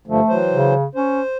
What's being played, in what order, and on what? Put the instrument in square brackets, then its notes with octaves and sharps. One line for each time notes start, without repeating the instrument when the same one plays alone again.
[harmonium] G2 D3 F3 [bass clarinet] A3
[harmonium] E3 F#3 C5
[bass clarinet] C#3
[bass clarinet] C#4 [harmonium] C5